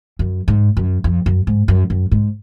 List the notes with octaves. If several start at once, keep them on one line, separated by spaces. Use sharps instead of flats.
F#2
G#2
F#2
F2
F#2
G#2
F#2
F#2
G#2